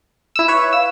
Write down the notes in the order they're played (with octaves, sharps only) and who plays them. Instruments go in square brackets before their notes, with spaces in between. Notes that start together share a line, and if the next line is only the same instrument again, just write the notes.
[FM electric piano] E4 E6
B4 C#5
[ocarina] F5 [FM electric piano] E6